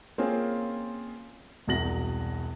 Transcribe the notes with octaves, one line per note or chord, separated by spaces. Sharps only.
A#3 C4 C#4 F4 G#4
E1 C2 F#4 A#6 F#7